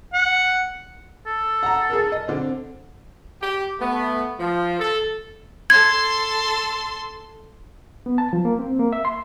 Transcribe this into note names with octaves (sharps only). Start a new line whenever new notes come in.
F#5
A4
F#5 A#5
G#4 A#4
D#5
D3 C4
G4
A3 B3
F3
A4
A4 C6 G#6
B3
A5
F3
A#3
C4
A#3
E5
C6